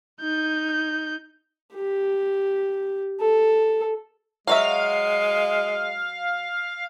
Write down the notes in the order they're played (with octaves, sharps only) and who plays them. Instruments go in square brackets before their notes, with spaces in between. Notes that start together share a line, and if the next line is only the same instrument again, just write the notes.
[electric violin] D#4 G6
[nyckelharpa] G4
A4
[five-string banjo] F#3 F#4 E5 [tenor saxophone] G#3 [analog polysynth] F5